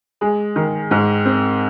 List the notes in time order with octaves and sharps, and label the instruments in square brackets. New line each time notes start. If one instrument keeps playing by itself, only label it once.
[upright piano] G#3
D#3
G#2
C4